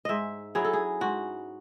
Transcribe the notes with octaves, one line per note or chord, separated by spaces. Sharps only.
G#2 D#5 E5
F#3 C#4 E4 G#4
A4
G#4
G#2 F#4